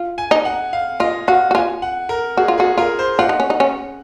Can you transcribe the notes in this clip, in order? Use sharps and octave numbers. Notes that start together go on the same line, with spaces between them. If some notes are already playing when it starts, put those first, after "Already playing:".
Already playing: F4
G#5
D#4
F#5
F5
F4 D#5
F#4 F5
F#4
F4 G#5
F#5
A#4
F#4 G#4
F4
F#4 G#4
F4 A#4
C5
F4 F#5
D#4
C#4
D#4
C#4